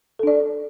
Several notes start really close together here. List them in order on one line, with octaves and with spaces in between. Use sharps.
A4 D4 D5